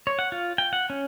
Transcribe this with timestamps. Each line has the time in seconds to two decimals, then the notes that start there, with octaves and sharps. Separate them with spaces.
0.07 C#5
0.19 F#5
0.32 F4
0.58 G5
0.73 F#5
0.90 C#4